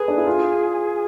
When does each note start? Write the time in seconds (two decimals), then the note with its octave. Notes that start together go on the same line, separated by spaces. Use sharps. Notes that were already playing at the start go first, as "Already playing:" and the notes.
Already playing: G#4 A4 B4
0.08 D4
0.18 E4
0.27 F4